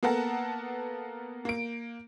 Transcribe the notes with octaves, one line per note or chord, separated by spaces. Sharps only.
A#3 B3 A4 A#4 F#5 A5
A#3 D7